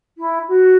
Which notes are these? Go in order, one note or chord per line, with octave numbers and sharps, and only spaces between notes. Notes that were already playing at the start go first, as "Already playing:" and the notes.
E4
F#4